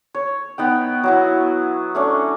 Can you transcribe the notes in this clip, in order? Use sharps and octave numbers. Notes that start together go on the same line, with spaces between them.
C#5
B3 D#4 G5
F#3 B3 E4
A3 C#4 D4